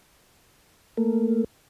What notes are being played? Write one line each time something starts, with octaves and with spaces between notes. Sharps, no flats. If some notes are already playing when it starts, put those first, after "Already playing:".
A3 A#3